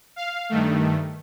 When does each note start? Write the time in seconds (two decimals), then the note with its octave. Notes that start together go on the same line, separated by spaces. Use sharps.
0.16 F5
0.49 G2 D#3 A3